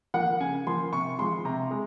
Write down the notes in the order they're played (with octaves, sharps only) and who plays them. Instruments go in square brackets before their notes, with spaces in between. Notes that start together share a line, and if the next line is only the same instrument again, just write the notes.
[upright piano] F3 A#3 F#5
C#3 G#5
F3 A#3 C6
C3 C#6
F3 G#3 C6
C3 A#5
G#3